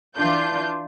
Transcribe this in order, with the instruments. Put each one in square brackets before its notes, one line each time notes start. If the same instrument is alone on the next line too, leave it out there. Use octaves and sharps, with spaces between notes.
[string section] E3 D4 F4 G6